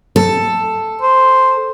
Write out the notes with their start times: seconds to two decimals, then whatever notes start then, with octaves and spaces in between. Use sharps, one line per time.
0.16 A4
1.02 C5